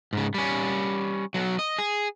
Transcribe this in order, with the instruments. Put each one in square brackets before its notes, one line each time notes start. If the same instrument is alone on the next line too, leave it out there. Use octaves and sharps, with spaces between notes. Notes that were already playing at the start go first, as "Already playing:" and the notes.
[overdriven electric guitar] G#2 C#3
G3 C#4
B1 F#3
D#5
G#4